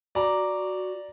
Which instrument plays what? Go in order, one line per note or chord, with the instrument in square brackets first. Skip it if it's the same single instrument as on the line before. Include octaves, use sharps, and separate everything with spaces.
[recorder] F#4 [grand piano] D5 A#5